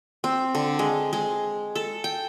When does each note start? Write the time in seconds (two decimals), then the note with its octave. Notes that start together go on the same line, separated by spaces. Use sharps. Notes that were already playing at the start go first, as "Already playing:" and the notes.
0.24 C4
0.55 D3
0.79 G#3
1.13 G#3
1.75 A4
2.04 G5